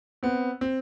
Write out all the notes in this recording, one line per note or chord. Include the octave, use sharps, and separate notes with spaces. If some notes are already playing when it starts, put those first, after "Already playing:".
B3 C4
C4